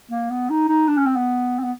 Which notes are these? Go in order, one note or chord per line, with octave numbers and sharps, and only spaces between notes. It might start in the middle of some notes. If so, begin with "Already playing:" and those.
A#3
B3
D#4
D#4
D4
C#4
C4
B3
C4
B3